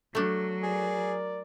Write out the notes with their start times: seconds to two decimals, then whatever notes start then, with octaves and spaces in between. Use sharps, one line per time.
0.15 F#3 A3 D4
0.63 G#4 A#4 D5